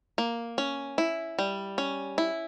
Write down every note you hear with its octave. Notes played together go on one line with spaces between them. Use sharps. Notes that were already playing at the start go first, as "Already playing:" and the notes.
A#3
C#4
E4
G3
C#4
E4